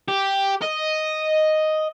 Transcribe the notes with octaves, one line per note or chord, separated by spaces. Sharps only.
G4
D#5